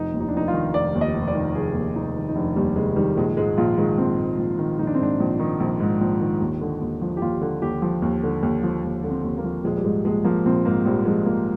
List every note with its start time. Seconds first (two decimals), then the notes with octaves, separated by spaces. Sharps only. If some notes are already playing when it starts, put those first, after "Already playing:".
Already playing: F1 D#4
0.13 D#2
0.20 D#4
0.28 D4
0.34 F1 D#4
0.48 F4
0.53 D#3
0.74 F1 D5
0.95 D#2
1.01 D#5
1.14 F1
1.28 D5
1.35 D#3
1.55 F1 G#4
1.75 D#2
1.96 F1 D#4
2.16 D#3
2.29 D#4
2.36 F1 D4
2.56 D#2 G3
2.76 F1 G#3
2.96 D#3 G3
3.17 A#1 G#3
3.37 G#2 G#3
3.57 A#1 F4
3.78 D#3 G#3
3.98 A#1 C4
4.18 G#2
4.38 A#1
4.59 D#3
4.79 A#1 D#4
4.87 D4
4.95 C4
4.99 G#2 D4
5.20 A#1
5.40 D#3
5.60 A#1
5.80 G#2
6.01 A#1
6.21 D#3
6.41 D#2
6.61 D3
6.81 D#2
7.02 F3
7.17 G4
7.22 D#2 F4
7.41 D3
7.62 D#2 G4
7.82 F3
8.02 D#2
8.23 D3
8.43 D#2
8.63 F3
8.84 D#2
9.04 D3
9.10 C4
9.24 D#2
9.38 A#3
9.44 F3
9.64 A#1 G#3
9.77 G3
9.84 G#2 G#3
10.05 A#1 G#3
10.24 F3 A#3
10.45 A#1 C4
10.65 G#2 A#3
10.85 A#1 G3
11.05 F3 G#3
11.26 A#1 A#3